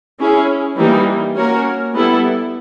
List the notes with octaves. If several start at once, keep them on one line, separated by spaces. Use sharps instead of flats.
C#4 E4 G#4
E3 G3 A#3 D#4
A#3 C#4 F#4 A#4 C#5
G3 B3 E4 A4